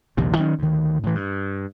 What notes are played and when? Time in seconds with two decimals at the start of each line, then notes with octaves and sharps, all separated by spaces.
0.17 A#1 D#2 C3
0.37 D#3 F#3 B3 C#4
0.59 D2 D#3
1.03 A2 E3
1.15 G2